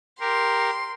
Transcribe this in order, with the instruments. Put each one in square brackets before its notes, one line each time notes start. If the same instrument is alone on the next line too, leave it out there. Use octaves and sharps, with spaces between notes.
[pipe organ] G4 A#4 [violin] C6